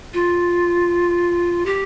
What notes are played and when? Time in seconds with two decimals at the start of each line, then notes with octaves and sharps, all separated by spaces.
0.14 F4
1.66 G4